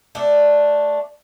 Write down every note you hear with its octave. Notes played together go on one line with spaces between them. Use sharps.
A3 D4